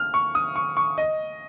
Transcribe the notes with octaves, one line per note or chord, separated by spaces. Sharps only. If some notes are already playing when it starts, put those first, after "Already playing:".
Already playing: F6
C#6
D#6
C#6
C#6
D#5